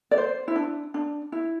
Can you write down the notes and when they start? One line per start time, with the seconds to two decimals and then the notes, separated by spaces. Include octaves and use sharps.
0.11 D5
0.18 C5
0.48 E4
0.56 D4
0.94 D4
1.32 E4